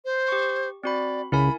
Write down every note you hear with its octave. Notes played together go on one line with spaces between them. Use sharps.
C5
G4 C#6
C4 F#4 D5 B5
C#2 E4 A#4 G#5 B5